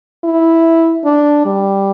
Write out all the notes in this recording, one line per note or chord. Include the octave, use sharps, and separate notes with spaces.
E4
D4
G3